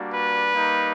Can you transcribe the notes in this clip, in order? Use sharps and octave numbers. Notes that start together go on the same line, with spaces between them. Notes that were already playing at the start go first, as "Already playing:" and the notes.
Already playing: G3 A#3 D4 F#4
B4
G3 A#3 D#4